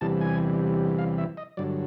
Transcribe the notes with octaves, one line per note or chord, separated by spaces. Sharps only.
E2 C3 E3 G3 A5
G#5
F5
E5
D#5
G2 D3 F#3 D5